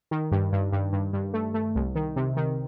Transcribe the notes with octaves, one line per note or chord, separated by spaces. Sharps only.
D#3
G2
G2
G2
G2
G2
A3
A3
C2
D#3
C3
D#3